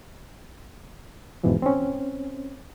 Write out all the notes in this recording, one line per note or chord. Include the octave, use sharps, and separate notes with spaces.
E2 G#2 B2 E3 F3
C4 C#4